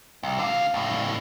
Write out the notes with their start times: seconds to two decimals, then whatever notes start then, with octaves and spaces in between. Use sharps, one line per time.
0.23 C2
0.39 D3 F5
0.74 C#2 A2